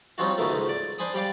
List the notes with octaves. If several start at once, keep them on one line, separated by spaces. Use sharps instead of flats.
G3 C4 C#4 D#4 F4 F#4
C#2 B2 D#3 A3
C#2 G#2
D5
D4 C5 G#5 B5 D#6
G3 G4 D5 F5 D6